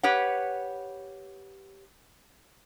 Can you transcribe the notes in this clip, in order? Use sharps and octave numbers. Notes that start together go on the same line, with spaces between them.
G4 B4 C#5 F#5